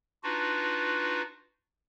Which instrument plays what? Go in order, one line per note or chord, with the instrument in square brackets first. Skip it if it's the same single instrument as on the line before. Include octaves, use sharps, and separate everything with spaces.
[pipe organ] D4 D#4 F4 F#4 B4